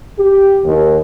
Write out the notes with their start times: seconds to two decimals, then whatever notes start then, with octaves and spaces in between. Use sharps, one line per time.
0.19 G4
0.65 D#2